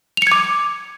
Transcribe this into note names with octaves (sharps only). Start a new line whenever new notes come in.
D6 G#6 C#7 F7